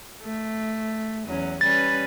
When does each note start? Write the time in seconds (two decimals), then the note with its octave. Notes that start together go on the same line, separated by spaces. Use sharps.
0.22 A3
1.27 E2 F#3 C#4
1.61 G3 C#4 B4 A6